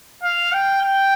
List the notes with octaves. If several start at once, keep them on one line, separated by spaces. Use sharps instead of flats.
F5
G5
G5